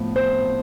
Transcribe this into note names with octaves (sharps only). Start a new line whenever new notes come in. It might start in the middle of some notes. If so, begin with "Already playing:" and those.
Already playing: A2 F3 B3
C5